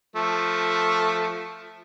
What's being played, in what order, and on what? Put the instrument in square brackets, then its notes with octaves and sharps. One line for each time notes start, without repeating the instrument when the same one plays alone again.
[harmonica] F3 A3